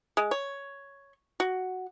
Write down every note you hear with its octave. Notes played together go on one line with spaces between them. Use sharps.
G#3
C#5
F#4